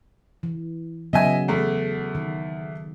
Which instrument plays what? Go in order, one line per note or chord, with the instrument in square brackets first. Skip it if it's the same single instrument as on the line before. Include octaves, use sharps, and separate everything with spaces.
[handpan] E3
[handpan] C#3 F#3 B3 [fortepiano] D#5 E5 G#5
[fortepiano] E2 A3
[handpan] D#3